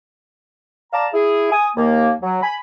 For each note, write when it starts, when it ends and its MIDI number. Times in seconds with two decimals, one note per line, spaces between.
0.93 1.06 74
0.93 1.06 77
0.93 1.06 81
0.93 1.06 82
1.13 1.49 64
1.13 1.49 68
1.52 1.67 80
1.52 1.67 87
1.77 2.12 39
1.77 2.12 58
2.22 2.39 54
2.43 2.55 80
2.43 2.55 83